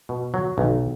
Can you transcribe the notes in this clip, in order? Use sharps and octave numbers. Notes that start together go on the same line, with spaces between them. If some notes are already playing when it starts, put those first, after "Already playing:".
B2
F#3
B1